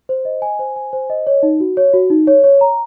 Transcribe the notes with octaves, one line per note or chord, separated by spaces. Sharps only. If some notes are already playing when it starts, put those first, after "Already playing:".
C5
D#5
G#5
C5
G#5
C5
D#5
C#5
D#4
F#4
C#5
F#4
D#4
C#5
C#5
A#5